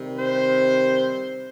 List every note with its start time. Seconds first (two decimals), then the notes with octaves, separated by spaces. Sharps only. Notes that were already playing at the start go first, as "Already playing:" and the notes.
Already playing: C3 D#3 G3
0.16 C5